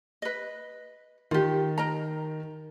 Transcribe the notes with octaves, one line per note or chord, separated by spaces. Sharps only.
B4 D#5
D#3 F4 G4
A#4 D#5 A#5